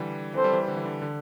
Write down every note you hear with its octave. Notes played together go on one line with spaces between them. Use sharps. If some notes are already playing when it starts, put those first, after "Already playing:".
Already playing: D3 E3 G3
E3 C4 A4 C5
G3
E3
D3
E3
D3
D3